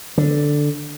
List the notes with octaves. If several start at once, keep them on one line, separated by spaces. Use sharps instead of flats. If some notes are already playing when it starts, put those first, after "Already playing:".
D3